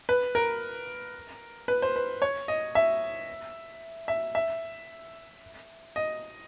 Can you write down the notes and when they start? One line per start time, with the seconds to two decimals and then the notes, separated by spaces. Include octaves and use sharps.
0.09 B4
0.35 A#4
1.68 B4
1.82 C5
1.96 B4
2.22 C#5
2.48 D#5
2.75 E5
4.08 E5
4.35 E5
5.96 D#5